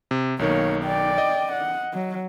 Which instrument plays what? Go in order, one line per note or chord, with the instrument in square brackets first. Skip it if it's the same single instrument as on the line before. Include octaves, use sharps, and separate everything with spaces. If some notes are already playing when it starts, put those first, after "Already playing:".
[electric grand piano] C3
[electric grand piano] B1 D#3 [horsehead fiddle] A#3 C#5
[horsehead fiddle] D5 G5
[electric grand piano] D#5
[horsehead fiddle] F#5
F#3